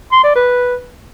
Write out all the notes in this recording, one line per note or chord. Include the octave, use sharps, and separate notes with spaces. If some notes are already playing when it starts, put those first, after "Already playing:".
C6
D5
B4